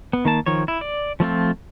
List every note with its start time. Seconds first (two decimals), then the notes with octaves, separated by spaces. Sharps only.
0.13 B3
0.25 D#3 A#3 A5
0.46 D#3 F3 C#5
0.68 E4
0.81 D5
1.20 F3 A3 C4 F4